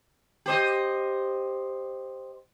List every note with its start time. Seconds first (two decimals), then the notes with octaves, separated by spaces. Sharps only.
0.46 G4 C5 D#5